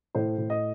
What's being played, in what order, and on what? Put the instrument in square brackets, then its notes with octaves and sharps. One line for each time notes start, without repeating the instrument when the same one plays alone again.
[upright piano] A2 C5
A2
D#5